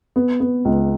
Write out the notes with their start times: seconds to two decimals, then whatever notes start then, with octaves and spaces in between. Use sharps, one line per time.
0.16 B3
0.40 B3
0.65 C#2